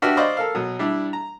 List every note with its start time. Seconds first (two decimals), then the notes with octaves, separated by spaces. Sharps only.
0.02 D4 F#4 G4 B4 E5 F6
0.17 C5 D5 D#5 F5 B5 C#6
0.37 A4 A#4 F5
0.55 B2 F#3
0.79 G3 D4 E4
1.13 A#5